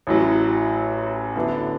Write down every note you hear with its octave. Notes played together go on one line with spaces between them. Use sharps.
A1 A2 F#3
D2 D3 F#3 B3 E4